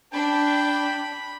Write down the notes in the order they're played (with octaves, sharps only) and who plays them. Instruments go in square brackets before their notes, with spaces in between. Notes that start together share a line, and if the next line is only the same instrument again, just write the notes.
[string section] D4 [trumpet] G5 [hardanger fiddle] B5